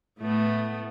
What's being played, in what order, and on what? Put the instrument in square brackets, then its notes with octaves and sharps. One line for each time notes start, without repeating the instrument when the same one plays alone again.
[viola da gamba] A2 A3 B3